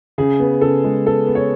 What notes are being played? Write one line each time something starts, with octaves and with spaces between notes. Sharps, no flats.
C#3 G#4
B3
C#3 A4
G#3
B3 A4
B3
C#5